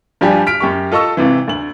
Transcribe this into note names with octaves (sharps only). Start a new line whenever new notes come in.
G2 F3 G3 G4 G#5
F6 B6 D7
F#2 G4 C#6
F4 A4 D#5 C#6 E6
G#1 C3 E3
D2 F#7